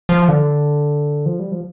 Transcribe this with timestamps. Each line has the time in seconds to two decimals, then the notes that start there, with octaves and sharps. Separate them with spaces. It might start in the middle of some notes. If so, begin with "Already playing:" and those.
0.09 F3
0.28 D3
1.26 F3
1.39 G3
1.52 F3